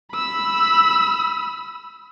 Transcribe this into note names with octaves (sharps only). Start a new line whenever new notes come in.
B5 E6